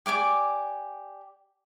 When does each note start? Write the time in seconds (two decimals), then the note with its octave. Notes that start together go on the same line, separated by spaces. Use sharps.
0.06 G4 D5 G#5 D6